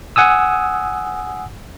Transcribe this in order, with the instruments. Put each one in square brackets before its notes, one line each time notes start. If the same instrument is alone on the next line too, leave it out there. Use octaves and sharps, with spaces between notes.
[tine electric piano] F#5 G#5 D#6 E6